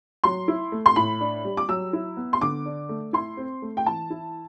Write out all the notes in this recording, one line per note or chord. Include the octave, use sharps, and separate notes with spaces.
F#3 C6
E4
A3
C6
A2 B5
D4
G3
D6
F#3 E6
E4
B3
C6
D3 D6
D4
A3
E4 C6
C4
A3
G5
E3 A5
E4